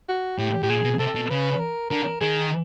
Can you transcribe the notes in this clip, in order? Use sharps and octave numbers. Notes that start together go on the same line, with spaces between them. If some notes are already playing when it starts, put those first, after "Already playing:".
F#4
A2 G4
A2 G4
A#2 G#4
B2
C3 A4
B2
C#3 B4
A#4
D3 A#4
D#3 G#4